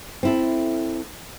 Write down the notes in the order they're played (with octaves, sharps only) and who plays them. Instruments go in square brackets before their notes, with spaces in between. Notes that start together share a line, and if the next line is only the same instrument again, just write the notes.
[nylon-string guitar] C4 E4 A4